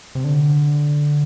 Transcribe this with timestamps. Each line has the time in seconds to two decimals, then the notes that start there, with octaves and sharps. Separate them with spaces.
0.15 C3
0.24 D3